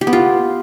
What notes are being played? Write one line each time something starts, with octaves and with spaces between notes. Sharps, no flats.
G4
B3
F4